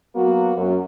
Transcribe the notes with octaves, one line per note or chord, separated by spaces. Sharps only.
F#3 A#3 B3 F#4
F#2